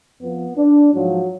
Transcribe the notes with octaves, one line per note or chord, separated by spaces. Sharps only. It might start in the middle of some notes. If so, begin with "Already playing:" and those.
F2 F3 B3
D4
G#2 F3 F#3